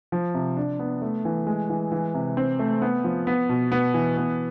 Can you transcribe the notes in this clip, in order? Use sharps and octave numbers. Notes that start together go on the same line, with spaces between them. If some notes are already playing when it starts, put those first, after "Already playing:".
F3
C3
D4
B3
A3
E3
G#3
E3
E3
C3
C4
A3
B3
F3
B3
B2
B3
E3
B3